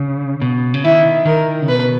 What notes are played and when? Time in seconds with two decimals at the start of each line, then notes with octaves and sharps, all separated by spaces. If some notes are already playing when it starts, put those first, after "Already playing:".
Already playing: C#3
0.42 B2
0.74 C#3
0.84 D#3 E4
1.26 D#3 A#4
1.62 C#3
1.68 B2 B4